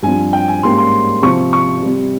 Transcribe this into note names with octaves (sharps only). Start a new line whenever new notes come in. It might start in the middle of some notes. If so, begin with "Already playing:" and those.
G2 F3 C4 G#5
G5
G#5
G#2 G3 A#3 C#4 C6
C6
C3 F3 C4 C#6
C#6
C3 G3 C4